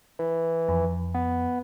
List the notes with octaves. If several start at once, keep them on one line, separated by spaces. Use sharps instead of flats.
E3
F2
B3